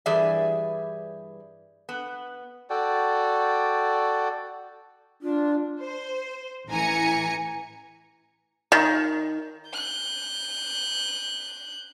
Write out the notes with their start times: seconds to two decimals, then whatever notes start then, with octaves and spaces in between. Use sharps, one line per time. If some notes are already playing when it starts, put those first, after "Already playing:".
0.06 G2 E3 G4 G#4 D5 E5
1.89 B3
2.70 F#4 A4 D5 G5
5.23 D4 F4
5.83 C5
6.70 A1 E3 G#5 A#5 C#7
8.72 D#3
9.70 F#6 G6